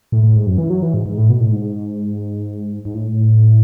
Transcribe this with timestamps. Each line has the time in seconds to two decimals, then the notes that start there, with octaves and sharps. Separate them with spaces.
0.12 A2
0.23 A2
0.36 G#2
0.47 F#2
0.58 E3
0.70 F#3
0.82 E3
0.94 G#2
1.06 G#2
1.17 A2
1.29 B2
1.40 A2
1.52 G#2
2.85 G#2
2.94 A2